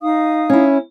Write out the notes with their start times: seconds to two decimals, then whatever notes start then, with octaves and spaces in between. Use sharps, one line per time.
0.01 D#4 F5 D#6
0.49 C#4 E4